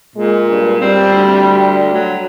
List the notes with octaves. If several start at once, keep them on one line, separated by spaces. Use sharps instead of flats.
A#2 G#3
G2
G3 C4
D2
F#3